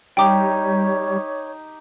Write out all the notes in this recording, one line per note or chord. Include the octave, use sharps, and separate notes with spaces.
G3 D#4 G4 C#5 G5 D6